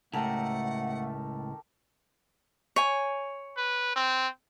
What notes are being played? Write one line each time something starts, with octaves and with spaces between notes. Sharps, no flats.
C#2 A2 A3 G4 A4 A#4 F#5
C#5 G#5
B4
C4